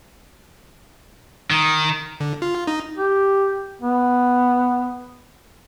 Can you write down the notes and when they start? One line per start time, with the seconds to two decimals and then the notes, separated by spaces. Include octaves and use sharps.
1.51 D#3
2.20 D3
2.42 F4
2.67 D#4
2.97 G4
3.82 B3